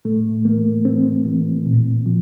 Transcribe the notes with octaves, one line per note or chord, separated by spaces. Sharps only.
A2 A3
E3 A#3
E3 C4
E3
A#2
F3